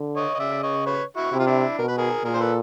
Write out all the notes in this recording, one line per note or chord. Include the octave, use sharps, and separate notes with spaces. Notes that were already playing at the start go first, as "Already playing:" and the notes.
Already playing: D3
C#5 D#5
D#5
C#3 D5 E5
C#5 D#5
B4 C#5
E4 F#4
C3 E4
F4
D4 E4
B2 A#4
B4
G#4 A#4
A#2 G#4 A#4
C5
A4 B4